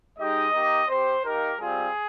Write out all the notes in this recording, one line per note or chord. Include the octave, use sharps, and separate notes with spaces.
G#3 D#4 G4 D#5
A#3 D#4 G4
C4 G4 C5
A#3 D#4 G4 A#4
G3 C4 F4 G#4